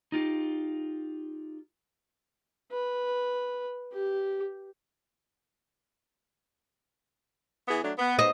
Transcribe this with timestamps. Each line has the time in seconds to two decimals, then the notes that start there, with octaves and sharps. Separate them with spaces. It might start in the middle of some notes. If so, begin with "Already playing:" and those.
0.12 D#4 F4 G4
2.71 B4
3.93 G4
7.68 E3 B3 G#4
7.82 F#3 A3 D4
7.98 B3
8.19 G#2 B3 C5 D#5